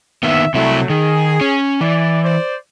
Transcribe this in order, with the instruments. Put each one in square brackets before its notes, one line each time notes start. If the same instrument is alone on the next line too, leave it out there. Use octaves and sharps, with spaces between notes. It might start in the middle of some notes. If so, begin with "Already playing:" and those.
[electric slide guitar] D#3 A#3 B3 [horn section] E5
[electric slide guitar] C3 E4 [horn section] F#3 A3
[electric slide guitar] D#3 [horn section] G#4
[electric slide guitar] C#4
[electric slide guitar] E3 [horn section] D5
[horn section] C5 D5